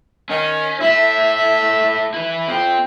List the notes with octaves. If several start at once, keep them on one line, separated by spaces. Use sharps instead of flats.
D#3 C#4
A3 E4 E5
E4 B4
F2 C4 G5